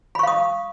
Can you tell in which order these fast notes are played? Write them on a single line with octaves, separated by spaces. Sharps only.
B5 C#6 F5 D#6